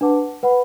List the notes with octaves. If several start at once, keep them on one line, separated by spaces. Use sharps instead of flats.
D4 B4 F#5 A5 D6
B4 F#5 B5